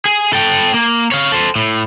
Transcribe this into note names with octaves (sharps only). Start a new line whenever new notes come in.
G#4
A4 G5
A#3
C#5 F5
A4 C5
A2